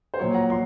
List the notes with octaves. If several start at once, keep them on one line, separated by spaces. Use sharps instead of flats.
C5
A#2 F#3 C#5
F#5 A#5
A#2 C6